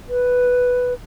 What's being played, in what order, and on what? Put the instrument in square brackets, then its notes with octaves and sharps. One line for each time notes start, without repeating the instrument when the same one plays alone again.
[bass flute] B4